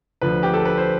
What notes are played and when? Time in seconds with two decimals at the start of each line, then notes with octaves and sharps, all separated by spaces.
0.21 D2 D3 F3 B4
0.43 G4
0.54 A4
0.65 B4
0.77 C5